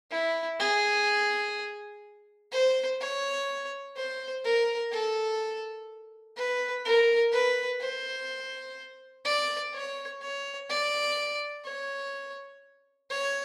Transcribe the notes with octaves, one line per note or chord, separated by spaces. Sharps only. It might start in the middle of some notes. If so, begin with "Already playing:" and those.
E4
G#4
C5
C#5
C5
A#4
A4
B4
A#4
B4
C5
D5
C#5
C#5
D5
C#5
C#5